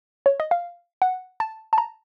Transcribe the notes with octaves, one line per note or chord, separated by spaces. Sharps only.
C#5
D#5
F5
F#5
A5
A5
A#5